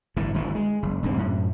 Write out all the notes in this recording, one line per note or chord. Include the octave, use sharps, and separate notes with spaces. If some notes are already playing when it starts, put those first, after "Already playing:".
G1 A2 E3
G1 D2 E3
G#3
F#1
E1 G2 D3 C4
F#2 A2